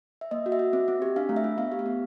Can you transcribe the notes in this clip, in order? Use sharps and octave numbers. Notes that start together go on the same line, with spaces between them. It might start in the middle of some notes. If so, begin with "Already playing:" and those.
E5
A#3 D#5
F#4
E5
F#4
C4
C4
G4
D4 F5
A3
E5
F4
B3 F5
G4
F5
B3